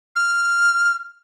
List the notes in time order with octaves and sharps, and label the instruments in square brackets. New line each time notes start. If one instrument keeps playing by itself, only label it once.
[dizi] F6